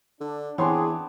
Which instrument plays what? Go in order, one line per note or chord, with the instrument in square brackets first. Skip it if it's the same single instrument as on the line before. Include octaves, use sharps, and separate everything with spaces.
[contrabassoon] D3 [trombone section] D4
[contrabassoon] E2 [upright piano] E3 C#5 C6 [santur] B3 C4 D4 [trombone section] G#4